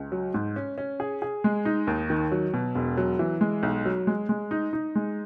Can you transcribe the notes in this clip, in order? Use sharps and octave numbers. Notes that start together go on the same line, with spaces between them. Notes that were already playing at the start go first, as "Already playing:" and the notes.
Already playing: C#2
F#3
G#2
C#4
C#4
G#4
G#4
G#3
D#4
D#2
D#3
F#3
B2
E1
F#3
E3
G#3
B1
F#3
G#3
G#3
D#4
D#4
G#3